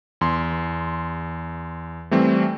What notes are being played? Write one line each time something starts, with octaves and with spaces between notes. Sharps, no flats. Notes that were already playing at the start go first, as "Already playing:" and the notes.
E2 C6
E3 G3 A3 C4